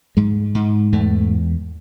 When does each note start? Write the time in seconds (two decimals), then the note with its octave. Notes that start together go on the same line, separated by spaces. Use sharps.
0.17 G#2 G#3
0.55 G#2
0.92 E2 A3